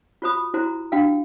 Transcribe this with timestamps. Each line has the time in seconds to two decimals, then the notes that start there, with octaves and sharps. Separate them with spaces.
0.22 F4 F#4 C5 B5 D#6
0.54 E4 F#4 C5 A#5
0.92 D4 F#4 F5 G5